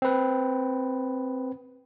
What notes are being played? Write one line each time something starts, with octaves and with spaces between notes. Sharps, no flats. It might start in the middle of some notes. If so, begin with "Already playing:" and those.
C4 B4